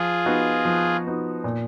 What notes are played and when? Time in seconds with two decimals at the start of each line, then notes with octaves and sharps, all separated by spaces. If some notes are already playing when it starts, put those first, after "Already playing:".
Already playing: F3 F4 G#4
0.26 B3 D#4 F#4
0.65 F3
1.05 B3 D#4 F#4
1.44 A#2